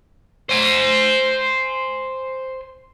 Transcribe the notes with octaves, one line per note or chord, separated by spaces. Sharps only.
C5 G#5